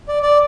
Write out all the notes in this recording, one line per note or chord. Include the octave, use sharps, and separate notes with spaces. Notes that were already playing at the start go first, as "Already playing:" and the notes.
D5
D5